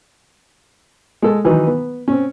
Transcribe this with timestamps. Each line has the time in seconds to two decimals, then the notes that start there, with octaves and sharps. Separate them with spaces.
1.22 G#3 A4
1.44 D#3 E3 F#3 D#4
1.67 B3
2.08 C4 C#4